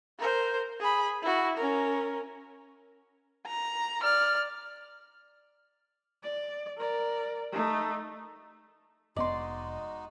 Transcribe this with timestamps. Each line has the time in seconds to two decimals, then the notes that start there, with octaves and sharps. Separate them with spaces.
0.19 A#4 C5
0.80 G#4 B5
1.22 E4 F#4
1.57 C#4 A#4
3.47 A#5
4.02 D5 F6
6.23 D5
6.77 A#4 D5
7.52 A3 D#4
9.16 F1 G#3 B3 D#4 F#4 D5 D#5 C6